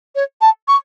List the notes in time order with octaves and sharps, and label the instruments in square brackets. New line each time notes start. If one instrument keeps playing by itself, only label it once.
[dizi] C#5
A5
C#6